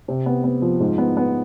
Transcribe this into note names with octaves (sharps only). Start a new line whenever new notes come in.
C3
B3
B3
F3
G#2
B3
B3